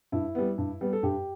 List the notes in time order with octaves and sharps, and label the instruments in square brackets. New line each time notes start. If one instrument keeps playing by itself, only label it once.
[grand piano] G2 E4
G3 B3
G2
G3 B3
A4
G2 G4